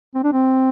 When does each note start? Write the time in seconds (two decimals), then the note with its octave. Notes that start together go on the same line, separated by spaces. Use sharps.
0.15 C4
0.23 D4
0.32 C4